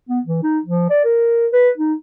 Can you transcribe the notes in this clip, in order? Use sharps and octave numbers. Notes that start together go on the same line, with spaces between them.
B3
E3
D#4
F3
D5
A#4
B4
D#4